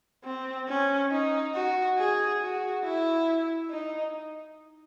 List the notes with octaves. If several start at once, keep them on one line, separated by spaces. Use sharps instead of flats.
C4
C#4
D#4
F#4
G#4
F#4
E4
D#4